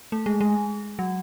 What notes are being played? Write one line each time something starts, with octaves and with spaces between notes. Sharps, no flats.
A3
G#3
G#3
F#3